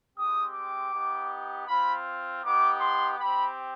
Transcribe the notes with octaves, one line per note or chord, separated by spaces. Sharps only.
G#3 C4 G4 D#6
D6
B3 D#4 G4
C4 F4 B5
B3 D#4 G4 D6
C6
C4 G4 B5